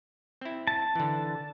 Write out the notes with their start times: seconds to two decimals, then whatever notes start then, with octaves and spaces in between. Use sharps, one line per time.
0.41 C4 E4
0.67 A5
0.95 D3 E3